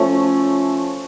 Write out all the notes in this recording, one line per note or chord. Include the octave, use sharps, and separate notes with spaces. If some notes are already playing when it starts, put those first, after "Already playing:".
Already playing: F3 A3 C#4